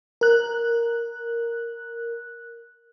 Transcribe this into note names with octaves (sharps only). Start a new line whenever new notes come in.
A#4 F#6